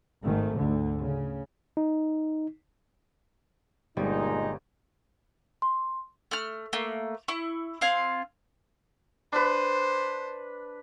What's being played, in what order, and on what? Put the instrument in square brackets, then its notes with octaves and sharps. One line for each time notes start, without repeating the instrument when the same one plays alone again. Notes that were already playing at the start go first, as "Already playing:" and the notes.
[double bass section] G#1 G#2 D#3 A3
D2 D3
C#3
[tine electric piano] D#4
[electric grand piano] G1 [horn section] A#2 D#4 [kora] G3 [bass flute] G#3
[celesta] C6
[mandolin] A3 F6
A3 A#3
E4 C#6
C4 F4 F5 G#5
[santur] D4 B4 [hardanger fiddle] C5